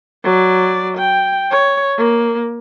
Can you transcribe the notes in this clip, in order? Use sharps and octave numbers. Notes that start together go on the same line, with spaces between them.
F#3 D5
G5
C#5
A#3